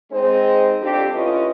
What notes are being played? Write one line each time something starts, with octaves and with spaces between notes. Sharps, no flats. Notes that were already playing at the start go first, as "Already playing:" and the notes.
G#3 C4 D#4 C5
F2 G3 C4 D4 G4
A2 A3 C#4 F4 B4 D#5